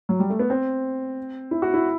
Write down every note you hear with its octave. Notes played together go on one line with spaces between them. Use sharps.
F#3
G3
A3
B3
C4
E4
F#4
E4